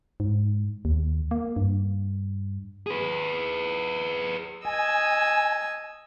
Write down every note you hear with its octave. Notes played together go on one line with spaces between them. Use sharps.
G#2
D#2
A#3
G2
G#4 B4
D#5 G#5 E6 G#6